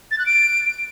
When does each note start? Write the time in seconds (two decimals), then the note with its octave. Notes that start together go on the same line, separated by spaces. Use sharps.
0.11 A6
0.19 F#6
0.26 D7